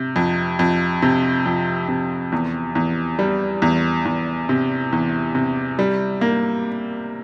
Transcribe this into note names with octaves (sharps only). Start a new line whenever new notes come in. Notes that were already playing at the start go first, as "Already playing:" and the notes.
Already playing: C3
F2
F2
C3
F2
C3
E2
E2
G3
E2
E2
C3
E2
C3
G3
A#3